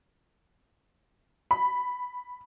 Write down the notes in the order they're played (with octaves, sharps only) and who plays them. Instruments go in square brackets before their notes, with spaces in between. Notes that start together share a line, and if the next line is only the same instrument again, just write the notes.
[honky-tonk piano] B5